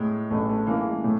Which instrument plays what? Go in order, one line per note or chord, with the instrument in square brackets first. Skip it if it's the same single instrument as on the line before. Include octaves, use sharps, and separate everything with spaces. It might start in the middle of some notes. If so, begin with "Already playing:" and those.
Already playing: [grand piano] A2 [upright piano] G#3
[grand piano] A1 [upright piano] A3
[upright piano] A3
[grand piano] E3 [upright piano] A#3
[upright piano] G#3
[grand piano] A2 [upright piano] A3